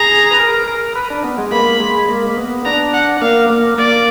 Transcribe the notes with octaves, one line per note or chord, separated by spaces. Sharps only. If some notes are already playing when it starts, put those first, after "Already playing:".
Already playing: G#4 A#5
B4
A#4
A#4
B4
D4
B3
G#3
A#3 B5
G#3
A#3
A#3
B3
D4 A#5
F#5
A#3 F5
A#3
A#3 D5